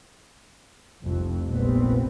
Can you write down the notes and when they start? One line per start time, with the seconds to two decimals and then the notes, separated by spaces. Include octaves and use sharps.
1.03 F1 C2 F2
1.48 F1 A#1 G3 B3 C4